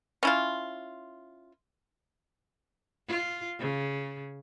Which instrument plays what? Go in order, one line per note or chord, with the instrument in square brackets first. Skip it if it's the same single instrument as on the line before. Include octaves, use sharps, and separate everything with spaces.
[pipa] C#4 E4 F4
[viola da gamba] F4
C#3